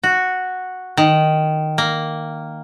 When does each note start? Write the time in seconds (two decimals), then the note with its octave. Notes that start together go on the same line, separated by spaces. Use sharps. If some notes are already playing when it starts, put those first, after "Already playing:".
0.04 F#4
0.97 D#3
1.78 A#3